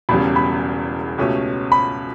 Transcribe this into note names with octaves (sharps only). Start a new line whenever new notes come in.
E1 E2 C#3 G3 B5
B5
C#2 B2 A3 C#4 G4
B5